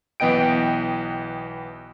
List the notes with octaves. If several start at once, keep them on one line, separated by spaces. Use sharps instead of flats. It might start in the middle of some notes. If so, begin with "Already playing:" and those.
B1 E3 B3 D#5 G5 D7